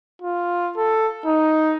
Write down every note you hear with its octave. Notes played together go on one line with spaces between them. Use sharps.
F4
A4
D#4